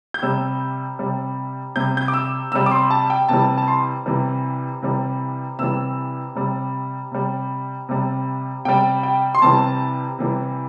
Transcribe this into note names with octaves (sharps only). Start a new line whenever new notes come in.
G6
C3 G3 E6
C3 G3
C3 G3 G6
G6
D6
E6
C3 G3 E6
D6
C6
A5
G5
C3 E3 G3 A5
A5
C6
C3 E3 G3
C3 E3 G3
C3 E3 G3 E6
C3 G3
C3 G3
C3 G3
C3 G3 G5
G5
C6
C3 E3 G3 A5
C3 E3 G3